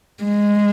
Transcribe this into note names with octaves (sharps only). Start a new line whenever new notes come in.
G#3